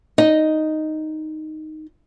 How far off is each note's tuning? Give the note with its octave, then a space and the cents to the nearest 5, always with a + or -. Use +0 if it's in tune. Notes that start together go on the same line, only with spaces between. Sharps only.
D#4 +0 D#5 +0